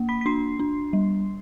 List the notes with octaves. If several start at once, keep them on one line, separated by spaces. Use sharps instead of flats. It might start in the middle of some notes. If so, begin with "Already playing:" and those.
Already playing: A#3
B5 B6
B6
D4 C6 C7
D4
G3